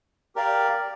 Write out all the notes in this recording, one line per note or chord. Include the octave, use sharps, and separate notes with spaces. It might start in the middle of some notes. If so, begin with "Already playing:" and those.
G4 A#4 D5 F5